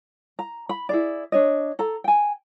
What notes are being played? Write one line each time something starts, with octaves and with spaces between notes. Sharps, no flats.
A#5
B5
E4 G#4 D5
D4 C#5 D#5
A4 A#5
G5 G#5